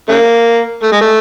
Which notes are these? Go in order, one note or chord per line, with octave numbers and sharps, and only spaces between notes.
C#3 A#3
A3
G#3
A3